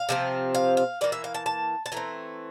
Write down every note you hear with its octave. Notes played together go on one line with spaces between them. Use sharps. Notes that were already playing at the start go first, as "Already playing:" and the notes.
Already playing: F5
C3 F3 A3 C4
F5
F5
E3 A#3 D5
E5
F5
A5
A5
A5
E3 A3 C4 A#5